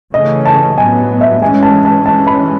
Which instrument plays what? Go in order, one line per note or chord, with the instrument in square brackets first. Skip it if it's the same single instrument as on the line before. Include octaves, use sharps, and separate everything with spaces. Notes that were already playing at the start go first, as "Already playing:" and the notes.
[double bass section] C#3 E3 A3 C#4 [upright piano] D#5
[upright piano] A5
[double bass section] A2 F#3 B3 [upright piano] G#5
[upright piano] E5
[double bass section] E3 G#3 C#4 [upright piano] G#5
[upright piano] A5
A5
[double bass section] E3 G#3 C#4 [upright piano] A5
[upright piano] B5